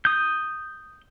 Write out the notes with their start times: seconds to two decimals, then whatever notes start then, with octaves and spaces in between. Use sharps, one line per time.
0.05 D#6 G6